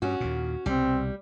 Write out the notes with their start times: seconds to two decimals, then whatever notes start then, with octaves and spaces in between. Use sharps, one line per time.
0.02 G2 C#4 F#4
0.21 D#2 A#2
0.66 C2 B2 G3 C4